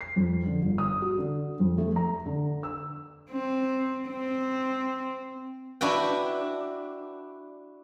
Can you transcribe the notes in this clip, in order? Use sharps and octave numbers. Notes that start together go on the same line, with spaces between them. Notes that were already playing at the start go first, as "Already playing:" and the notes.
C7
F2
D3
G1
D#6
F#4
D3
F2
A3
A#5
D3
E6
C4
C4
D4 E4 F#4 B4 G5